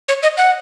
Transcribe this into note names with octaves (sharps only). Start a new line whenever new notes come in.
C#5
D#5
F#5